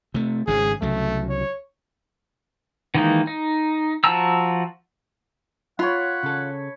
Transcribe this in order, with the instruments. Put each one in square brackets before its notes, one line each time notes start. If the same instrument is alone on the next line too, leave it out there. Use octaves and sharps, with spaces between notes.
[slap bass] C3 A3
[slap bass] G#1 G#2 C#3 [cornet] G#4
[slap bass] C2 C#3 F#3 [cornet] A3
[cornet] C#5
[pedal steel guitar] D#3 E3 G#3 A#3 D#4
D#4
F3 F#4 A5 A#5 E6
[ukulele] F4 [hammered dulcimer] C#5 B5 [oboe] F#5
[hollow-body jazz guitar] C#3 A4